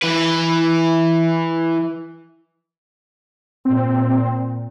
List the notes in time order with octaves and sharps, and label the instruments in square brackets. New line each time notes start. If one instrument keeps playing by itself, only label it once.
[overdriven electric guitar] E3 B4
[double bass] A#2 [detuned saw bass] C4